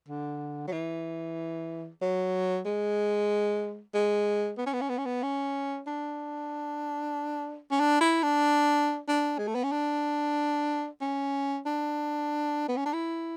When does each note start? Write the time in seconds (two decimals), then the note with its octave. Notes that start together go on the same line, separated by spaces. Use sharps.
0.08 D3
0.67 F#3
0.73 E3
2.02 F#3
2.65 G#3
3.94 G#3
4.58 B3
4.66 C#4
4.73 B3
4.81 C#4
4.89 B3
4.98 C#4
5.05 B3
5.23 C#4
5.87 D4
7.71 C#4
7.80 D4
8.01 E4
8.23 D4
9.08 D4
9.38 G#3
9.47 A3
9.55 B3
9.63 C#4
9.72 D4
11.01 C#4
11.66 D4
12.69 B3
12.77 C#4
12.85 D4
12.94 E4